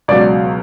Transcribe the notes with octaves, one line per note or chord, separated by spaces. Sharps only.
C#2 B2 F#3 D5